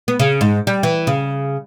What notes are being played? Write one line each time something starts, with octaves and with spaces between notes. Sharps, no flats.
B3
C#3
G#2
G3
E3
C#3